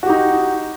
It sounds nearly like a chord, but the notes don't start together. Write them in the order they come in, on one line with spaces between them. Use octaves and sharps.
F#4 G4 D#4